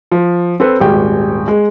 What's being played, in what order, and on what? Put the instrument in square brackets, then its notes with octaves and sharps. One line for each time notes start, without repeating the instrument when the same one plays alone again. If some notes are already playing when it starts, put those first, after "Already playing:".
[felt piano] F3
C4 A4 B4
D#1 G#1 G#3 G4 G5
G#3